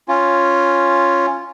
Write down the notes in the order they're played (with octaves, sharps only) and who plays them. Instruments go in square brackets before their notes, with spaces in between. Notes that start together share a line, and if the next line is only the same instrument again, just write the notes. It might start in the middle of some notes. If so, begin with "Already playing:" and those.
[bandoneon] C#4 F4